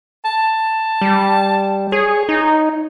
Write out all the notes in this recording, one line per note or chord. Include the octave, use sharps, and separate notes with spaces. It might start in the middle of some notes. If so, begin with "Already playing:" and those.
A5
G3
G#4 C#5
D#4